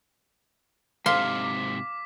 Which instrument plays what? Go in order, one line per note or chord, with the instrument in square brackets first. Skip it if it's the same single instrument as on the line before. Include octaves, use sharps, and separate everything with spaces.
[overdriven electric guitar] G#2 C3 [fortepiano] F5 [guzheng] C6 [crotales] D6 B6